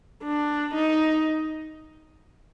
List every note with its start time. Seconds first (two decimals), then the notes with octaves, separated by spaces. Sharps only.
0.23 D4
0.74 D#4